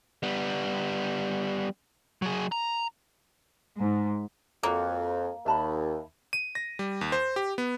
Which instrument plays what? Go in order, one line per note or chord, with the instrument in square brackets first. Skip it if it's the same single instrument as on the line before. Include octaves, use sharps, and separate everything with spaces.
[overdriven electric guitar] G3 B3
F#3 G#4
A#5
[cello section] G#2
[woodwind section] F2 [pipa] A#3 [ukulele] F#4 C#5
[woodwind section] D#2 [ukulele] E5 A5 B5
[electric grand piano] D#7
A#6
G3
D#2
C5
G4
B3